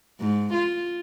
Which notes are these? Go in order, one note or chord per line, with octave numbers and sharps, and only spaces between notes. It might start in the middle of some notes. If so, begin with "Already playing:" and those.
G#2
F4